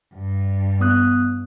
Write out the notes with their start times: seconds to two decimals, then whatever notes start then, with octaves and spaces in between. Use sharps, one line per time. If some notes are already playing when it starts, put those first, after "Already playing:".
0.14 G2
0.81 B3 D#6 F#6